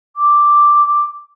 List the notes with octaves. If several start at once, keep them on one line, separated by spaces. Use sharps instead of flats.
D6